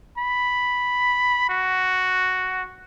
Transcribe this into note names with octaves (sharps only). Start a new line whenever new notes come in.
B5
F#4